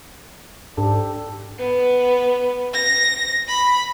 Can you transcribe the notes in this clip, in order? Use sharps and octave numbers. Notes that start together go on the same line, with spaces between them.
G#2 D4 G4 A4
B3
A#6
B5